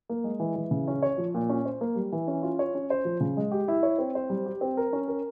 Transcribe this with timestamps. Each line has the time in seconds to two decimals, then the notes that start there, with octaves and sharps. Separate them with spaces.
0.09 A#3
0.24 G#3
0.40 E3
0.56 E3
0.71 C#3
0.88 C#4
1.02 C#5
1.18 F3
1.34 A#2
1.49 C#4
1.65 C5
1.81 A#3
1.96 G3
2.12 E3
2.28 C#4
2.43 F4
2.59 C#5
2.75 C#4
2.90 C5
3.05 F3
3.20 C#3
3.37 G#3
3.52 G4
3.68 E4
3.83 C#5
3.98 C4
4.15 C5
4.30 G3
4.46 G4
4.61 C4
4.77 A#4
4.93 C#4
5.08 A#4